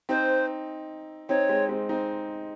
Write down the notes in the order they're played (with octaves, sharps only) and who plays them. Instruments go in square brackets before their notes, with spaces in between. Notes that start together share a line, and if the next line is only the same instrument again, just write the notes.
[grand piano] C4 D#4 [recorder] C5
[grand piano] C4 D#4 [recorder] C#5
[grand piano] G#3 C4
G#3 C4
C4 D#4